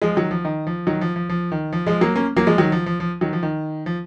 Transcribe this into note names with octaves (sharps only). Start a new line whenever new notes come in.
F3 G#3
D#3 F#3
F3
D#3
F3
D#3 F#3
F3
F3
F3
D#3
F3
F3 G#3
F#3 A#3
A#3 C#4
F#3 A#3
F3 G#3
D#3 F#3
F3
F3
F3
D#3 F#3
F3
D#3
F3